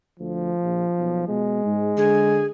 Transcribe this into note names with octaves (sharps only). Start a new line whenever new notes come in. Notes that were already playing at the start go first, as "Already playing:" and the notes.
D2 F3
A#1
B1
B2 G#3
G#2
D3 G#4